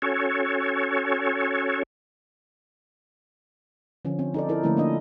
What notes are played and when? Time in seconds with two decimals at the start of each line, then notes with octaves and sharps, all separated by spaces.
0.02 C#4 F#4 A4 C#5
4.05 D3 F3 C#4
4.19 C4
4.34 D#4 A4 D5
4.49 D#4 E4 A4 A#4
4.63 D3 F3 A3 A#3 C#4 E4
4.77 A#3 D4 D#5